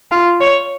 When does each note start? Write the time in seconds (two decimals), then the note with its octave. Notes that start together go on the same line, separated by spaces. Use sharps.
0.12 F4
0.41 C#5